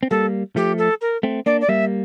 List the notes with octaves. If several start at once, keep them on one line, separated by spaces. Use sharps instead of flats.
C4
G3 A#3 A4
F3 A3 G4
A4
A#4
A3 C4
A#3 D4 D5
D5
G3 A#3 E5